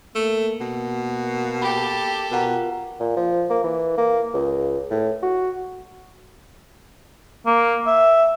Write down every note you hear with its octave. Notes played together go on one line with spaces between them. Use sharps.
A3 A#3
B2
G4 A4 B5
B2 F4 A#4 F#5 A#5
A#2
F3
A#3
E3
A#3
C#2
A2
F#4
A#3
E5